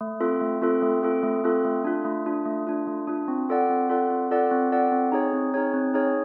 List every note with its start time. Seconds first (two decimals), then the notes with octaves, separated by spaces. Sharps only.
0.01 A3
0.21 C4 F4 A4
0.41 A3
0.62 C4 F4 A4
0.82 A3
1.02 C4 F4 A4
1.23 A3
1.44 C4 F4 A4
1.65 A3
1.84 D4 F4
2.05 A3
2.26 D4 F4
2.45 A3
2.67 D4 F4
2.87 A3
3.07 D4 F4
3.28 C4
3.49 F4 A4 D5 F#5
3.69 C4
3.89 F4 A4 D5 F#5
4.11 C4
4.31 F4 A4 D5 F#5
4.51 C4
4.71 F4 A4 D5 F#5
4.92 C4
5.12 D#4 G#4 C#5
5.33 C4
5.54 D#4 G#4 C#5
5.74 C4
5.94 D#4 G#4 C#5